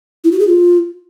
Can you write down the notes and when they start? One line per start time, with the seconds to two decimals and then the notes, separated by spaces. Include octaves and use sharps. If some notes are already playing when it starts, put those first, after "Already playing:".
0.24 E4
0.32 F#4
0.40 G#4
0.47 F4